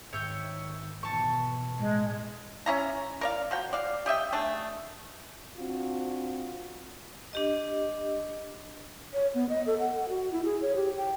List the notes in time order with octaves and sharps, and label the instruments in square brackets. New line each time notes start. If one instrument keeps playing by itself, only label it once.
[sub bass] G#2 [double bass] D#3 [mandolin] C#5 E5 G5
[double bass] B2 E3 [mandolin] A5 C#6
[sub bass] A2 [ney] G#3
[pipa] C#4 E4 A#5
A#4 D5 F5
F3 F#4 G5
D5 F5
G4 D#5 E5 G5
A3 D4 G#4
[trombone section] C4 D4 F4 F#4
[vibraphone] D4 G4 D#5
[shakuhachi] C#5
B3
D#5
A4
F#5
F#4
E4
G#4
C#5
G4
G5